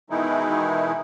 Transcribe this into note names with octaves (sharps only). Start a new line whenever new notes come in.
B2 D#3 E3 G#3 D#4 E4